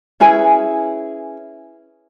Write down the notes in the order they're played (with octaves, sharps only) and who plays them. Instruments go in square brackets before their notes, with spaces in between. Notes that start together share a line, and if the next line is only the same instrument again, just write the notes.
[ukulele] C#4 E4 G#4 B4